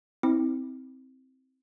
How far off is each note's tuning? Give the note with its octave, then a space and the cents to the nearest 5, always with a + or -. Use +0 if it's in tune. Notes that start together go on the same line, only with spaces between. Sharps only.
C4 +0 E4 -35 D6 +25